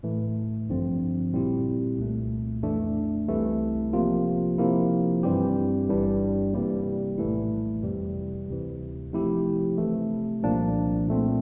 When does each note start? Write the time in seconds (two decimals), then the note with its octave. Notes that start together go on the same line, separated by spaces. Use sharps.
0.03 A2 E3 A3
0.68 A1 G2 D3 F3 C4
1.33 A#2 G3 C4 E4 G4
1.99 C2 A#2 A3
2.63 F2 E3 A3 D4
3.28 C2 C3 E3 A3 E4
3.93 C3 F3 A#3 F4
4.58 C3 F3 A#3 E4
5.23 G2 E3 G3 C4 G4
5.88 G1 G2 E3 G3 D4
6.53 C3 E3 G3 A#3
7.18 A#1 A2 E3 A3 E4
7.83 F2 C3 E3 G3
8.48 D2 C3 E3
9.13 C3 F3 A3 E4 G4
9.78 C3 E3 A3
10.43 C2 A#2 F3 A#3 D4
11.08 A#2 A3 C4